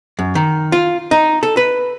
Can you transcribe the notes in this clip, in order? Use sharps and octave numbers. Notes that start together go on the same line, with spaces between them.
F#2
D#3
F4
D#4
A4
B4